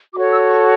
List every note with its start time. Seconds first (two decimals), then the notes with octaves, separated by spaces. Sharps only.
0.13 F#4 D6
0.16 A4 C#5
0.31 E6
0.49 C#6